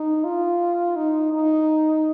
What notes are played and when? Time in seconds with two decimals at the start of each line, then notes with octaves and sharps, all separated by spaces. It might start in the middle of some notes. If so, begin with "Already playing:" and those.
Already playing: D#4
0.24 F4
0.96 D#4
1.33 D#4